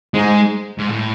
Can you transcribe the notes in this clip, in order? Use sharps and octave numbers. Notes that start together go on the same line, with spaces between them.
G#2 G#3
G#2
A2